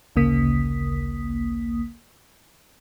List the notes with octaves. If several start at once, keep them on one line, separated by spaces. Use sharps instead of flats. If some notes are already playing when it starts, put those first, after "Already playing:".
A1 D2 C#3 A#3 D#6 B6